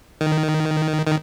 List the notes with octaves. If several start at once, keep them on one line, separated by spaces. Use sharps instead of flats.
D#3
D#3